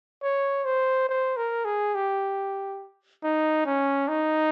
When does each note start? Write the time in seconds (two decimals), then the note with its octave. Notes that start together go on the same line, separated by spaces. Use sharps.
0.23 C#5
0.65 C5
1.09 C5
1.37 A#4
1.65 G#4
1.95 G4
3.23 D#4
3.66 C#4
4.09 D#4